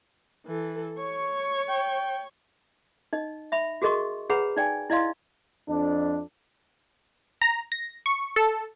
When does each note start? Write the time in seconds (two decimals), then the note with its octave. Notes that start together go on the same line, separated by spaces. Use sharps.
0.46 E3 A4
0.99 C#5 C#6
1.69 G5
3.13 D#4 D#5
3.52 E5 B5
3.82 F#4 G#4 A#4 D#5 C6 C#6
4.29 G#4 B4 C#5 F#5 A#5 B5
4.57 D#4 D5 G5 G#5
4.90 E4 D5 D#5 F5 C6
5.69 F2 D4
7.42 A#5
7.72 A#6
8.06 C#6
8.36 A4